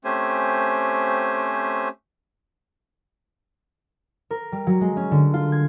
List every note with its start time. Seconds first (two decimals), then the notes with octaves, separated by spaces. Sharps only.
0.05 A3 C4 C#4 G4 C5 G#5
4.30 A#4
4.52 G3
4.67 F#3
4.81 G#3
4.97 C#4
5.11 D3
5.34 F4
5.52 G#6